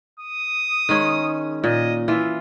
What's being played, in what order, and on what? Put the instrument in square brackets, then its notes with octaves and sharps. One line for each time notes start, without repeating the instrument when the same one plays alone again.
[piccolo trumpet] D#6
[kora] D#3 G#3 C#4
[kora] A#2 [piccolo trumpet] D#5
[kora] E3 F4 [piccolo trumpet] E5